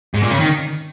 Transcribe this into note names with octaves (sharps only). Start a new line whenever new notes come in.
G#2
A#2
C#3
D#3